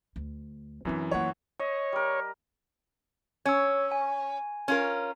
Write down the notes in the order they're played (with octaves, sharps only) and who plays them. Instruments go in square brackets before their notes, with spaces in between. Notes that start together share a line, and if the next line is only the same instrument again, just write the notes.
[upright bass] D2
[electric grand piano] F#2 E3 [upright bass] C4 D4
[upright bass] A#3 F4 [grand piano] C#5 F#5
[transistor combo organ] C#5 [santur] D#5
[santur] G3 A#4
[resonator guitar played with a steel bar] C#4 [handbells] C#5 E6
[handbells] G#5
[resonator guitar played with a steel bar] C#4 F4 A#4